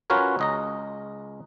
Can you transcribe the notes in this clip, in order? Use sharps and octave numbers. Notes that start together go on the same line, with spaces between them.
C#4 F4 F#4 A#4 B4 C#5
C#2 D#5 A#5